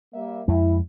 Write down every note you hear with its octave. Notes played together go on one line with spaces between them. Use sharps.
G3 A#3 E5
F2 G#3 E4